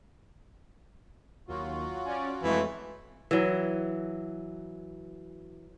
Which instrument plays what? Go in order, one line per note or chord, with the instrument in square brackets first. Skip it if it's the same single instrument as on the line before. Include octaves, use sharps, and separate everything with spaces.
[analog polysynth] D#2 [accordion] F#3 F4 F#4
[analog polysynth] C#4 D5
[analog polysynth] F2 G#3 A3 [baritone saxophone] E3
[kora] E3 F#3